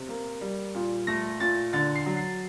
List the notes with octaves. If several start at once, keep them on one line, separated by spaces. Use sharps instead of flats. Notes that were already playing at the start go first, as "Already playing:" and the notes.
Already playing: C3
A#3
G3
A#2
A3 A#6
A#2 A6
D3 A6
C7
F#3
C7